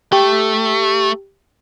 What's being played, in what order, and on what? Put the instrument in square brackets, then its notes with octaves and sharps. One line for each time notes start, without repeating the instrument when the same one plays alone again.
[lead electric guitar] A3 [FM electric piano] G4